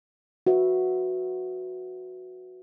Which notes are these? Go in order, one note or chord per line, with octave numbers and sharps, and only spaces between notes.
F#4 B4 E5